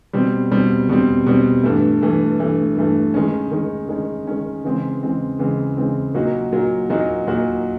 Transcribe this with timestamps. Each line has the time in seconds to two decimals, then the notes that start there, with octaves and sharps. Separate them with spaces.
0.13 B2 G3 C4
0.52 B2 G3 C4
0.89 B2 G3 C4
1.26 B2 G3 C4
1.63 G2 E3 A3
2.02 G2 E3 A3
2.39 G2 E3 A3
2.77 G2 E3 A3
3.14 D#3 G#3 C#4
3.52 D#3 G#3 C#4
3.89 D#3 G#3 C#4
4.27 D#3 G#3 C#4
4.64 C#3 E3 G#3 C4
5.03 C#3 E3 G#3 C4
5.39 C#3 E3 G#3 C4
5.77 C#3 E3 G#3 C4
6.14 A#2 F#3 A#3 D#4 F#4
6.52 A#2 F#3 A#3 D#4 F#4
6.90 A#2 F#3 A#3 D#4 F#4
7.27 A#2 F#3 A#3 D#4 F#4